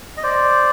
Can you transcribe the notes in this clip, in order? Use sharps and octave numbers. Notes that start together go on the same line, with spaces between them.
D#5
C5 D5